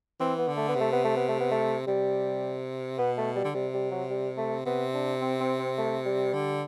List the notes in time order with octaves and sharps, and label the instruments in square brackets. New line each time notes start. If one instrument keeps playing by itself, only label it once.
[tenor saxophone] E3 [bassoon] C4
[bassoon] B3
[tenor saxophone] D3
[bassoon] A3
B3
[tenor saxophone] C3
[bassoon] A3
B3
A3
B3
A3
B3
A3
[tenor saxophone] C3 [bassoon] G3
[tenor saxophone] B2 [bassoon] B3
[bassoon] A3
G3
[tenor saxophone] D3
[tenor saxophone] C3 [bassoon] G3
[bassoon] G3
F#3
G3
A3
[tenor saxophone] C3 [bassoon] B3
[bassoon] D4
C4
C4
C4
A3
G3
[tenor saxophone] D3